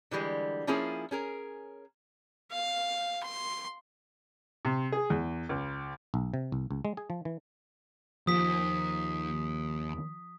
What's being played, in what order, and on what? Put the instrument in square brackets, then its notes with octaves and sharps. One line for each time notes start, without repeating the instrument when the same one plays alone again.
[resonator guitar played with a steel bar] D3 E3 G3 G#3
F3 A#3 C#4 E4 F4 G#4
C#4 G#4 A#4
[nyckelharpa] F5
C6
[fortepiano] C3
G#4
E2
C#2
[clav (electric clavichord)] B1
C3
C2
C#2
G#3
G#4
F3
E3
[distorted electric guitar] D#2 [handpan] F3 [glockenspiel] D#6 B6